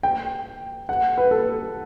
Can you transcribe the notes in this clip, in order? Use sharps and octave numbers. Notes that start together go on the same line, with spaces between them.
G5
F#5
B4
A4